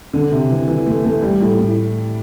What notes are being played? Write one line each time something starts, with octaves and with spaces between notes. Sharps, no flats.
D3
C3
E3
E3
A3
A3
G3
A2
A2